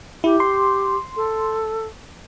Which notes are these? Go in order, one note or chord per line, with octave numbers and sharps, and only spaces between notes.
E4 G4
C6
A4